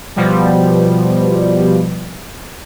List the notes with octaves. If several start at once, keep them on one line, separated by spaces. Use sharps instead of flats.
B2 F3 G3